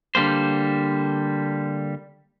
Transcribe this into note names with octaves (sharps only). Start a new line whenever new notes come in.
D3 G3 A#3 C5